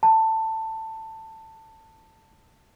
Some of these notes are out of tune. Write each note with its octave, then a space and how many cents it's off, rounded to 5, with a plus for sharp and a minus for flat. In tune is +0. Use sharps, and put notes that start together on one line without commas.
A5 +15